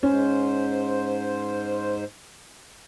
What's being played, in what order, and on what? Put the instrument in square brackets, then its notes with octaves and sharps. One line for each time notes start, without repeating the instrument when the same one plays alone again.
[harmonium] G#2 C5 [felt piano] C#4